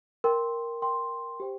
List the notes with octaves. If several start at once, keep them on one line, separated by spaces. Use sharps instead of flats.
A#4 G5 C6
A#4 G5 C6
G4 C5 G5